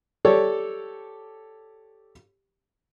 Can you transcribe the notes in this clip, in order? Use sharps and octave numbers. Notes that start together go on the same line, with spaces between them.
G4 A4 C#5 D5